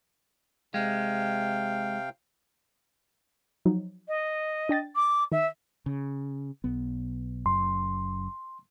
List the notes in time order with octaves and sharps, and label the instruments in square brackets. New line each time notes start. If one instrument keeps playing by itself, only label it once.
[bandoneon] C3 F5 G5 [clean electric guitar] G#3
[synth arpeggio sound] F3 F#3 D#4
[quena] D#5
[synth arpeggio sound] D4 G5 A6
[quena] D6
[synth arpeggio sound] D#3 [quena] E5
[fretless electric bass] C#3
B1 B3
[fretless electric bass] F#1 F#2 [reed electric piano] C6